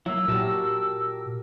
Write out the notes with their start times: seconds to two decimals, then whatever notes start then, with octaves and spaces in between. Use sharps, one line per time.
0.06 F#3 A#3 E4 E6
0.28 A#2 F#4 G4 A#4 A5